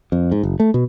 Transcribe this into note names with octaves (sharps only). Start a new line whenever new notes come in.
F2
G#2
F#1
A3
B2